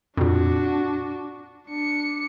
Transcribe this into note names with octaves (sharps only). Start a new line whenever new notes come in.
F2 A#2 D4 F#4
D4 C#7